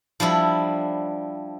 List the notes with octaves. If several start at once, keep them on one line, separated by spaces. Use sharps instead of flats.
F3 G3 D4 E4